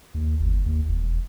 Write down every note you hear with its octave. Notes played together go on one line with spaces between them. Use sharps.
D#2
G1
D#2
E1